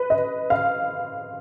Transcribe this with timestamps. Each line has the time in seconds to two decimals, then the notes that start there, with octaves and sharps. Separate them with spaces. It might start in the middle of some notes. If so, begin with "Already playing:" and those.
Already playing: B4
0.10 D#5
0.50 F5